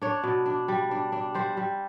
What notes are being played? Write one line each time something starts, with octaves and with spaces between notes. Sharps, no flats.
D4 C#5
B2
D4
G3
D4
D4
G3 C5
G3